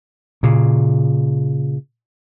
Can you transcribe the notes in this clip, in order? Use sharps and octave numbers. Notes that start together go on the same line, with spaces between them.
A#2 C#3